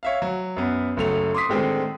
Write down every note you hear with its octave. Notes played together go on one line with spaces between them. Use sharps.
C#5 E5 F5
F#3
F#2 B3
F#1 F#3 A3 F7
C6 D6 D#6 B6
A2 D3 D#3 G#3 C4